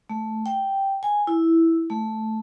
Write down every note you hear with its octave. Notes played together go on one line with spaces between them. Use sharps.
A3
G5
G#5
E4
A3